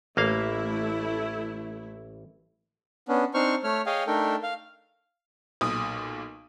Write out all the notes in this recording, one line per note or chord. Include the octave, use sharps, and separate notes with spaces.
A1 A3 A#3 E4 F5
B3 C#4 D4
C4 D4 D#4 C5 C#6 F6
A3 C#5 F6
G#4 C#5 D#5 F5 G5 G#5
A3 D4 D#4 A4 A#4 G5
F5
B1 A#2 D#6